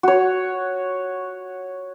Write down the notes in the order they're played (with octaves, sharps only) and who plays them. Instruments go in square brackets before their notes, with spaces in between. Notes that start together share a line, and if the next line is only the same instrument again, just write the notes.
[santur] F#4 C#5